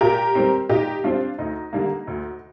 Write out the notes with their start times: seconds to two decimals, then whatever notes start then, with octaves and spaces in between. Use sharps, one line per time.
0.01 A#2 G4 A#4
0.35 G3 C4
0.69 A#2 D#4 G4
1.04 G3 C4 D4 F4
1.38 D2 D#4
1.73 D3 G3 A#3
2.07 D2